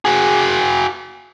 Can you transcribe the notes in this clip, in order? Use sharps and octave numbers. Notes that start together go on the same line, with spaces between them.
F#4 G#4